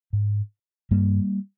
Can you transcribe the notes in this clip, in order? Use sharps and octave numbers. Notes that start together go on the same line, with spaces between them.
G#2
G2 G3 A#3